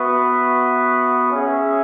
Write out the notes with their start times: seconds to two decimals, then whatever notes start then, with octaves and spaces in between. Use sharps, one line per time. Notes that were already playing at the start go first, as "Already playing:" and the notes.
Already playing: B3 F#4 B4 E5
1.31 C#4 G#4 E5